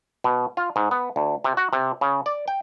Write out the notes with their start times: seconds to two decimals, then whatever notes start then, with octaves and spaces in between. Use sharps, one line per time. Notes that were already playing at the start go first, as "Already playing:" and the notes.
0.24 B2
0.57 F4
0.76 G#2
0.91 B3
1.16 D2
1.44 C3
1.57 F#4
1.73 C3
2.01 C#3
2.26 D5
2.48 G5